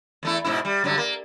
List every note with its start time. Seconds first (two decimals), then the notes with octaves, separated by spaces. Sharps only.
0.23 E2 A3 E4
0.45 G#2 B2 E4
0.65 G3
0.84 G2 D3 F#3
0.98 A#3